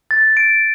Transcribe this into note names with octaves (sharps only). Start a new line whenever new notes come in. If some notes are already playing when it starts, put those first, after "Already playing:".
A6
D7